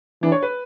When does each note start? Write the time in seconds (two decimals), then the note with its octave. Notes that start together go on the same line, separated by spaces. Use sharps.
0.22 E3 D4
0.32 C#5
0.43 B4